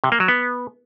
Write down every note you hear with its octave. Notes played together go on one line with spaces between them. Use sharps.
C3
A#3
F#3
B3